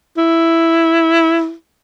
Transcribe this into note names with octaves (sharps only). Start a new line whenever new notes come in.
E4